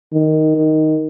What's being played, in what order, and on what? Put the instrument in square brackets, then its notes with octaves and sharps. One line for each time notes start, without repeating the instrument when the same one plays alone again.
[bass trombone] D#3
D#3